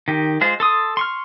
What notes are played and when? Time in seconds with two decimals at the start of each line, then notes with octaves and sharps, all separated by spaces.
0.08 D#3 G4
0.41 G#3 F4 C5
0.60 A4 C6 D#6
0.97 C6 C#6 F6